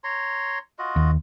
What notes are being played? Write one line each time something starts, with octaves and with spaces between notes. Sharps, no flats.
C#5 A#5 C6
F4 F#4 D#5
D#2